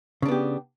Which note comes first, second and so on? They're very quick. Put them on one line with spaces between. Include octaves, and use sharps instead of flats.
C#3 D4 B3 G4